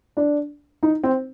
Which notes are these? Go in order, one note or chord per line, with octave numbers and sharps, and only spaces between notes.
D4
D#4
C4